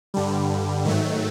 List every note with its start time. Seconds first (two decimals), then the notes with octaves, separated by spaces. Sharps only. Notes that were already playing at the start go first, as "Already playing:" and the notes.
0.14 G2 D3 G3
0.85 G#2 D#3 F#3 A3